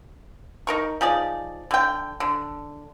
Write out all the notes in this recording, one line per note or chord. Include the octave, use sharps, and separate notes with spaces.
D#4 A#4 C#6
F3 D#4 G#4 D5
D3 G5
D3